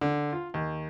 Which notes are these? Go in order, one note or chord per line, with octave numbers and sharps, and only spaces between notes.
D3
F4
D#2